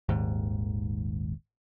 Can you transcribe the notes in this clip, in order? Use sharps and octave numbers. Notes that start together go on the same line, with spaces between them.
D#1 G#1 D#2 G#2